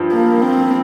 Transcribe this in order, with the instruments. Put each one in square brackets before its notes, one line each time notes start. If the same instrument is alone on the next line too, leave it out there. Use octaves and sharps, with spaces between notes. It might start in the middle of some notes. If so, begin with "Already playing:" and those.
Already playing: [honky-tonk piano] G2 F3
[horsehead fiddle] A#3
C4